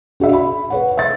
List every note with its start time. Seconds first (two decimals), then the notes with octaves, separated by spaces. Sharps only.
0.20 D4 F#4 D5 E5
0.33 B5
0.70 B4 C#5 F#5
0.97 E5 A6